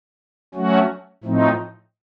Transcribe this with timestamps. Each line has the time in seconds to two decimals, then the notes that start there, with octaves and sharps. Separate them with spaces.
0.55 F#3 A3 C#4 F#4
1.24 A2 F3 A3 C4 D#4